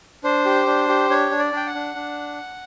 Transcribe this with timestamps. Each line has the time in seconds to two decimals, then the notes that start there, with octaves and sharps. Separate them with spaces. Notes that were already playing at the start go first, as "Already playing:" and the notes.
0.24 D4 C5
0.46 G4
0.67 D4
0.88 G4
1.10 D4 C#5
1.31 D4
1.39 D5
1.52 D4 G5
1.67 F#5
1.75 D4
1.95 D4